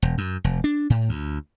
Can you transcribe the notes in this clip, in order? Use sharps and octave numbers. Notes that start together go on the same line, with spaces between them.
E1
F#2
F1
D4
A2
D2